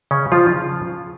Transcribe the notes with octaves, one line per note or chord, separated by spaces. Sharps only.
C#3 C#4
F3 F4
C#3 F3